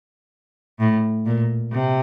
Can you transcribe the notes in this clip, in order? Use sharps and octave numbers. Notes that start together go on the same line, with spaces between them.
A2
A#2
C3